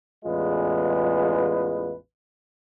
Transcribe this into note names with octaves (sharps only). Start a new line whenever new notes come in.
A1 E2 G#3 F4 B4